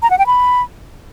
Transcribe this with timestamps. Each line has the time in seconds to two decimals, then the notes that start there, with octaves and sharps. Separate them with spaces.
0.02 A#5
0.10 F#5
0.19 G5
0.27 B5